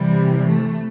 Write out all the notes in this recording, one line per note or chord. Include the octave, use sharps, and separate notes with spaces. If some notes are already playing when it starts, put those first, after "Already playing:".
Already playing: C3 E3 G3
A3